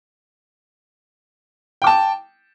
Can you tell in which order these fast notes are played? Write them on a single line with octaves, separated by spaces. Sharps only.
G5 D6 A5